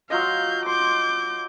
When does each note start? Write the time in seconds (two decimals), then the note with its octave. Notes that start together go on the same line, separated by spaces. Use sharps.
0.10 F#3 F4 D#5 F5 G6
0.66 C6 D6 G6